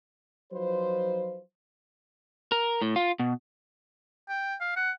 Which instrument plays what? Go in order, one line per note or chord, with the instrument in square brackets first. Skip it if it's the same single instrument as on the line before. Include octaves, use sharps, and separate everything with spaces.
[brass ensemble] F3 F#3 D#4 F4 B4 C5
[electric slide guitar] A#4
A2
F4
B2
[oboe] G5
F5
F#5